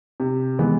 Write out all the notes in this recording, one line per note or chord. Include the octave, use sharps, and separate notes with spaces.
C3
E3 G#3 B3